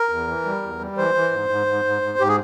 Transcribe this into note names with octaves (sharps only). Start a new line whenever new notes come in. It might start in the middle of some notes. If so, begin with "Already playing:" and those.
Already playing: A#4
E2
E3
G3
E2
G3
E3 C5
E3
G#2
G#2
G#2
G#2
G#2
G#2 G4
G#4